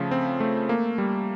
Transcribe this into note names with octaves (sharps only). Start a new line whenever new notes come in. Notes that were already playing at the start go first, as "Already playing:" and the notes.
Already playing: C#3 F3 A3
C4
A3
A#3
G3